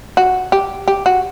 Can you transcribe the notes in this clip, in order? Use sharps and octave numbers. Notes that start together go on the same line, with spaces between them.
F#4
G4
G4
F#4